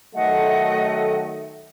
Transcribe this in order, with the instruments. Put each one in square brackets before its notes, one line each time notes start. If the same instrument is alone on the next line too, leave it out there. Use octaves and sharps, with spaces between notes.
[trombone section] D#3 F#3 A3 [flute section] D#5 F#5